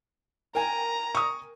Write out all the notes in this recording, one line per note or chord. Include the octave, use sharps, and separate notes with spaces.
A#4 G5 G#5 A#5
C#6 D#6